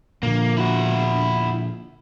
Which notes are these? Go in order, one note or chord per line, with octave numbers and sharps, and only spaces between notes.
A#2 D3 F3 A#3
E4 F#4